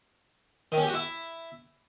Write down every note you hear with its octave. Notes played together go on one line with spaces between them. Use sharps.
D#3
C#4
G4
F#4
E4